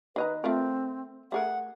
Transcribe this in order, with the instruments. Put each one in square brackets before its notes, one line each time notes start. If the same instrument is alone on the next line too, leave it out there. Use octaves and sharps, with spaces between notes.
[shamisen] D#3 D#5 A#5 [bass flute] B4
[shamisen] A3 F4 A#4 [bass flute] C4
[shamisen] A3 G#4 A#4 [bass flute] F#5